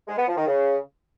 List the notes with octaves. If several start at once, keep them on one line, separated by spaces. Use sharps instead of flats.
G#3
B3
F3
D#3
C#3